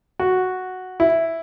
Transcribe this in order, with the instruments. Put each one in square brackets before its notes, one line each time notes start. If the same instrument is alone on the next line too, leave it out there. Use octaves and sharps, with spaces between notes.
[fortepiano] F#4
E4